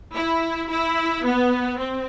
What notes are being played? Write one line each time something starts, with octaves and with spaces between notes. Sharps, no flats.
E4
E4
B3
C4